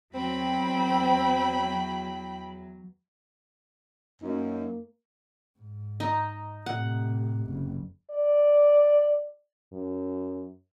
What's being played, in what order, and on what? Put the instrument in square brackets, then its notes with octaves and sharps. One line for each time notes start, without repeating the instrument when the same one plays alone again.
[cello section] E2 F#3 [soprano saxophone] C4 [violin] G5 B5
[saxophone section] F#2 [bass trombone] A#3 [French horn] D#4
[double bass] G#2
[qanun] D#4
[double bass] A2 C3 [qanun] F#5
[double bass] F#1
[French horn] D5
F#2